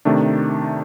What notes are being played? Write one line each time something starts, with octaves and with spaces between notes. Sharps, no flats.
C3 D#3 A3 D4